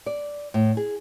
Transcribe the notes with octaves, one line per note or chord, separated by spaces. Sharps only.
D5
A2
G#4